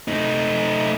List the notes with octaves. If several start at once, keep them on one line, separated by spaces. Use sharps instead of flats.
A3 D#4